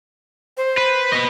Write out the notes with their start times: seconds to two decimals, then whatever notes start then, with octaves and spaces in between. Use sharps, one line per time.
0.57 C5
0.77 B4
1.12 B4 D#5